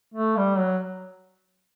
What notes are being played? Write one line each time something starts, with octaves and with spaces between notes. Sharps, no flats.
A3
G3
F#3